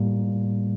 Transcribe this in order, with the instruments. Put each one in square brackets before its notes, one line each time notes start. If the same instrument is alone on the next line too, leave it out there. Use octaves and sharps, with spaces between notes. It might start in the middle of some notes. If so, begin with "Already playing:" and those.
Already playing: [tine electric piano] A2 G3 A#3